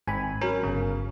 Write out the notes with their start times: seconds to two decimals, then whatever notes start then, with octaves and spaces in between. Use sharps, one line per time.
0.07 G#1 G#2 C4 G#5 B5
0.41 F#3 C#4 A#4
0.63 G1 C#3